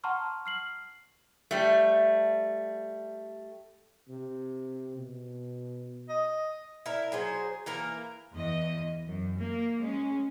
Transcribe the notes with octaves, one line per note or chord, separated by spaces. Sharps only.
F#5 A5 A#5 C6 C#6 F6
F6 C7 F#7
G3 A3
C3
B2
D#5
E4 A#4
F#3 G#4 C5
E3 A#3 A#4
E2 D#5
F#2
A#3
G#3 C#4